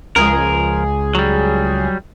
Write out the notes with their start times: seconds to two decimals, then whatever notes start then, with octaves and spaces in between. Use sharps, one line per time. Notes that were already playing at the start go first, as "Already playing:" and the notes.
0.16 C#2 F3 G#4 A#4
1.15 F#3 G3